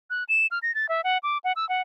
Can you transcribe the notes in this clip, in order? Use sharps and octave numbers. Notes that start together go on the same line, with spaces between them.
F#6
E7
F6
A#6
A6
E5
F#5
D6
F#5
E6
F#5